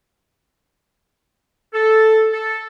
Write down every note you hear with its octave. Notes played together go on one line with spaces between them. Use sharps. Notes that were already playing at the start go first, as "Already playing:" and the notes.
A4
A4